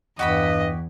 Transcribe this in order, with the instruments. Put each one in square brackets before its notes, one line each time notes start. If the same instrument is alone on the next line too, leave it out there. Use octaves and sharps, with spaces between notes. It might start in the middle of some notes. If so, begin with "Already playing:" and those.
[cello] E2 [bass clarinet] G2 [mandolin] F#4 G4 B5 [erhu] D#5